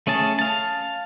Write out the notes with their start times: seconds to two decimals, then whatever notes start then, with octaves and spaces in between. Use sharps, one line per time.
0.07 A3 C#4 G#4 A5
0.39 F5 A5